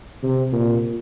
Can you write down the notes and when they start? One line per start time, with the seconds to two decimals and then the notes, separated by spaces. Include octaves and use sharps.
0.23 C3
0.52 A#2